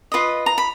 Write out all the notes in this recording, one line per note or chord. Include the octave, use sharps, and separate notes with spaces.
F4 B4 D#5
A#5
B5